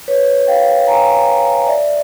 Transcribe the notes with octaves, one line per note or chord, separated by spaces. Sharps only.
B4 C#5
F5 G5
G#5 A#5
D5 E5